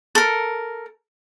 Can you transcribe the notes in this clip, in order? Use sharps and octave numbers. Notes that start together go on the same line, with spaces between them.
A4 A#4